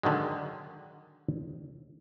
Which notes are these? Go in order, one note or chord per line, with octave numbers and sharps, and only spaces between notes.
D3 D#3 F#3 G#3